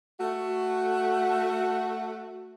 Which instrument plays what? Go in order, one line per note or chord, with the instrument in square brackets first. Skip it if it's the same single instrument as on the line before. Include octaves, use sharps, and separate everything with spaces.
[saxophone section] A3 F#4